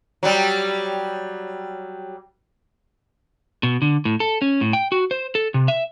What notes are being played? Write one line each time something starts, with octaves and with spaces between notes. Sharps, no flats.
F#3 G3
B2
D3
A2
A4
C#4
A2
G5
F#4
C5
A4
C3
E5